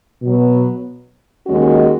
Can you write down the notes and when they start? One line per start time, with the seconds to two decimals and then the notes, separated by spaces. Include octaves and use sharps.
0.22 B2 F#3 B3
1.46 D#2 D#3 G#3 C#4 F#4